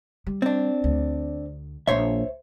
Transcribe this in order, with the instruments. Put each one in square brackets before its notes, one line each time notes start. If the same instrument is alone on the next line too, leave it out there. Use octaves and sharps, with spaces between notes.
[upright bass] G3
[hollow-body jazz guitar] C4 D4
[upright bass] D2
[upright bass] A#1 A#3 [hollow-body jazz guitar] C5 C#5 E5